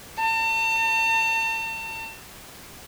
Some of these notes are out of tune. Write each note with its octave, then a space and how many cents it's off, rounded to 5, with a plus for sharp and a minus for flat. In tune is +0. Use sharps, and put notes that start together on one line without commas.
A5 +40